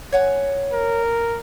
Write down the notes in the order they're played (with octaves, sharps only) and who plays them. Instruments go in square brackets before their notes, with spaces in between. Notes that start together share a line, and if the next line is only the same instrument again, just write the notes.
[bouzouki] C#5 F#5 G#5
[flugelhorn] A#4